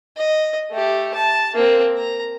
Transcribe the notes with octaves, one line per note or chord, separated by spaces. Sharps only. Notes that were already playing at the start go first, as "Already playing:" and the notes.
D#5
A3 G4
A5
A#3 C4
A#5